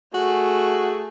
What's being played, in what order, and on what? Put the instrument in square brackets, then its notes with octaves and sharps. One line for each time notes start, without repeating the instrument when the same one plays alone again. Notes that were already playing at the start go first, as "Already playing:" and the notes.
[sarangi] A3 [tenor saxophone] F#4 [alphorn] G#4